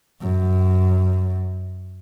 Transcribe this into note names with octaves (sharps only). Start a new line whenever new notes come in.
F#2